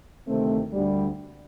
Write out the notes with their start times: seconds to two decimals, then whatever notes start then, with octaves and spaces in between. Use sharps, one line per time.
0.27 D2 C3 D#3 A3 C4
0.73 D2 D3 G3